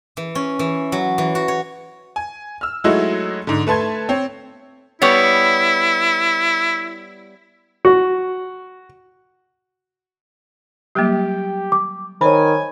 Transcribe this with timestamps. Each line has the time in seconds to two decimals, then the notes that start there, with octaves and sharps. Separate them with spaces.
0.17 E3
0.35 C#4
0.59 E3
0.92 F#3
1.18 E3
1.35 F#4
1.48 C#5
2.16 G#5
2.61 E6 F6
2.84 F#3 G#3 A3 D#4 E4 F#4
3.47 G#2 D3
3.67 A3 B4 A5 C6 G#6
4.09 C4 C#5
5.02 G3 B3 E4 C#5
7.85 F#4
10.95 F#3 G3 A#3 G4
11.72 D6
12.21 D#3 C5 C#5 G#5 B5